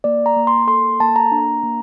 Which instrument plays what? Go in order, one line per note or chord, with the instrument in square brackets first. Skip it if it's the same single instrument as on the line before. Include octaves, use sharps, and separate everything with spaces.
[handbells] A#3 D5
A#5
A#3
C6
A4 C6
A#3 A5
A#5
D4
A#3